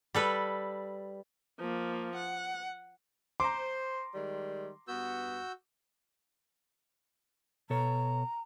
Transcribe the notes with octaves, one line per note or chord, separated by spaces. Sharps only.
G3 A4 B4
F3 A#3
F#5
C5 A#5 C6 D6
D#3 G3 G#3
G2 B3 F#4 E6 G6
B2 A4 C#5 A#5